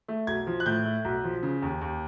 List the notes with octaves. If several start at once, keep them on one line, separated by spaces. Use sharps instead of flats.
A3
B1 G#6
F3
F#6
A2 G6
A3
B1
F3
C#3
D#2
D#2